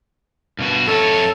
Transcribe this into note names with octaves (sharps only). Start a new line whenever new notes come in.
G2 B2 F#4
F2 A4 C#5 E5